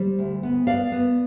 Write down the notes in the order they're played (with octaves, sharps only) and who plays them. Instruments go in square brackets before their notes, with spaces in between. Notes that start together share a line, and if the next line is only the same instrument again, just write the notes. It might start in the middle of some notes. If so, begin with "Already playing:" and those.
Already playing: [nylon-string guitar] G3 C5
D2
B3
B3 D5 F5
B3